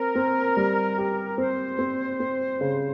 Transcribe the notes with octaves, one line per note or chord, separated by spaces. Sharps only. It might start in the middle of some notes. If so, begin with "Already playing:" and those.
Already playing: C4 A#4
C4
G3
G4
C4 C5
C4
C4
C#3